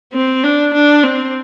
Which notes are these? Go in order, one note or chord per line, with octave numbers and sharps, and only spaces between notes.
C4
D4
D4
C4